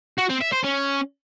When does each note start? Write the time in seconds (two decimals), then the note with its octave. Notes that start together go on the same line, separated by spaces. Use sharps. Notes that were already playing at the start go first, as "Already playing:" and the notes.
0.18 F#4
0.29 C4
0.41 E5
0.52 C5
0.64 C#4